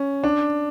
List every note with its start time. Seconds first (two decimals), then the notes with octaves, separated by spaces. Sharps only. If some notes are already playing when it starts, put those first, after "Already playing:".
Already playing: C#4
0.24 D4